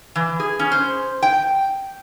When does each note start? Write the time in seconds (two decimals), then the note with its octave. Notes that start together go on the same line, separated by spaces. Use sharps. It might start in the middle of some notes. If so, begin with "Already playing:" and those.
0.16 E3
0.40 G#4
0.59 C#4
0.72 C5
1.22 G5